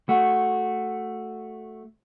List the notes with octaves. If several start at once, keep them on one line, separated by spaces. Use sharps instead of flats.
A3 F#4